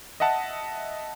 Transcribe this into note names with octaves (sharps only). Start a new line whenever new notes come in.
D#5 E5 F#5 A5